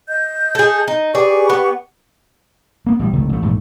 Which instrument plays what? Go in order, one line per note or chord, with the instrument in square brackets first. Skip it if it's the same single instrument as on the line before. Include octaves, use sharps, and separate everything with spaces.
[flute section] D#5 G6
[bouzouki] G#4 A4
D#4
[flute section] G4 B4 C#6 [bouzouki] G#4 D5
[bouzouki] B3
[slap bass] A#3 B3
A1 B2 G3
F1 C#2 D#3 A3
A1 A3
A#1 G#2 E3 A3